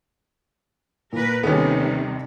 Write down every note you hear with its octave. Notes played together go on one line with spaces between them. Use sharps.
A#2 A#4 B4
D#2 C3 D#3 G3 B3 C#4 A4